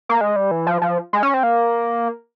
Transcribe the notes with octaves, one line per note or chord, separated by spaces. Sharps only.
A#3
G#3
G3
E3
F3
F3
G#3
C#4
C4
A#3